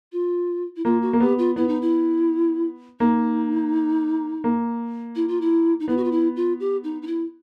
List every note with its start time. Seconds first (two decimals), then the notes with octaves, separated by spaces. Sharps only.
0.12 F4
0.76 E4
0.85 A#3 F4
1.02 F#4
1.13 A#3
1.20 B3 G4
1.38 F4
1.56 B3 E4
1.68 D#4
1.81 E4
3.00 A#3 D#4
4.44 A#3
5.16 E4
5.28 F4
5.41 E4
5.80 D#4
5.88 B3 E4
5.97 F#4
6.04 F4
6.11 E4
6.36 F4
6.60 G4
6.84 D#4
7.02 D#4
7.07 E4